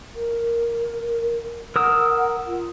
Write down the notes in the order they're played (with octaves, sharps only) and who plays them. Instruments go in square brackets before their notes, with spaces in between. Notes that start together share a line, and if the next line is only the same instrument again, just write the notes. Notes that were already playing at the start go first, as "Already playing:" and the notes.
[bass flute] A#4
[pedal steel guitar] A#4 D#6 E6 [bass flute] F#5
[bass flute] F4